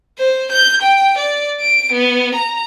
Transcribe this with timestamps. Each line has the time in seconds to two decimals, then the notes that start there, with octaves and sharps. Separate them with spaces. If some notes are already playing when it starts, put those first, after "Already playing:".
0.18 C5
0.51 G6
0.81 G5
1.18 D5
1.60 D7
1.92 B3
2.34 A#5